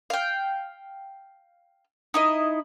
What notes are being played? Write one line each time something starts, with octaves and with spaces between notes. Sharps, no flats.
F5 G5
D#4 E4 D#5